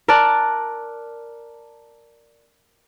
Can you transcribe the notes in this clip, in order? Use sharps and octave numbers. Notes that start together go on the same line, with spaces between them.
A#4 D5 A5 F#6